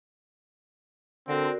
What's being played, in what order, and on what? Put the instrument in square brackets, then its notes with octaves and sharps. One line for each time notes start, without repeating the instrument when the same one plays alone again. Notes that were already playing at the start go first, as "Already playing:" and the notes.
[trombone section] D3 [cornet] C4 [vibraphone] F#4 A#4 D5